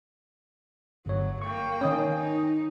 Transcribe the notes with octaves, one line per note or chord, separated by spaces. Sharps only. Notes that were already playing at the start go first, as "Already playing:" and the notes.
G1 F#3 C#5
A#3 G5 C#6
D#3 C#4 C#5 D#6
D#4